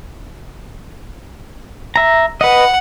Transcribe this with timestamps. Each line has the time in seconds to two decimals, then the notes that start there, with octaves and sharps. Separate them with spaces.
1.96 E5 A#5
2.41 B4 D#5 F#5